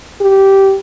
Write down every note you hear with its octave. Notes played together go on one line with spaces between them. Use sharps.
G4